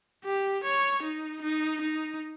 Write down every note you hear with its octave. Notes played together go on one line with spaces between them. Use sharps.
G4
C#5
D#4
D#4
D#4